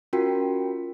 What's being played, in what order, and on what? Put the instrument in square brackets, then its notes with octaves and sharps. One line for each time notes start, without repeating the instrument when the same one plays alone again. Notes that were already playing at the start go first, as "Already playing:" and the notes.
[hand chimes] C#4 F4 F#4 A#4 G5 B6